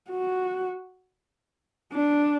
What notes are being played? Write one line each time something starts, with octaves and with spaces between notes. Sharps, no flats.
F#4
D4